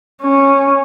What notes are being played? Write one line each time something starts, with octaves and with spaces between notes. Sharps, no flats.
C#4